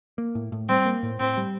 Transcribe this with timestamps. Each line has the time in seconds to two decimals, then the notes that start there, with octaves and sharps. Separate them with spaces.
0.18 A#3
0.35 A2
0.52 A2
0.68 G3 C4
0.85 A#3
1.03 A2
1.19 A2 C4
1.37 G3